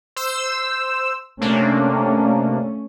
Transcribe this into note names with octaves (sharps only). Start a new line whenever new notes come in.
C5 E6
C3 A3 A#3 C#4 D4